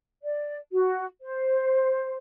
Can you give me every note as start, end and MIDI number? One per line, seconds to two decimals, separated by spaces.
0.22 0.56 74
0.72 1.05 66
1.22 2.15 72